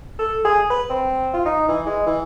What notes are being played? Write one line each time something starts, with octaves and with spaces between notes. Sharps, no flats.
A4
G#4
B4
C4
F4
D#4
E3
G#3
E3